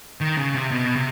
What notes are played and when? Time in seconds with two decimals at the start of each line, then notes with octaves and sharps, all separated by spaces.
0.21 D#3
0.37 C#3
0.54 C3
0.71 B2
0.96 C3